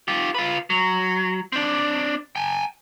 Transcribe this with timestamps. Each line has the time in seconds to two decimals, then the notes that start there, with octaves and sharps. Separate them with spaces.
0.08 F4 G4
0.35 F4 B4
0.70 F#3
1.52 C4 D4
2.35 G5 G#5